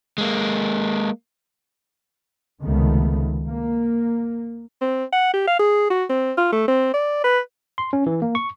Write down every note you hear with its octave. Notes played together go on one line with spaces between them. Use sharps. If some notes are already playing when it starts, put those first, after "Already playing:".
G#3 A#3
C#2 C3 D#3 A3 B3
A#3
C4
F#5
G4
F5
G#4
F#4
C4
F4
A3
C4
D5
B4
C6
C#4
E3
A#3
C#6